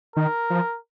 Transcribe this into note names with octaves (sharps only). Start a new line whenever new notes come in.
D#3 A#4
F3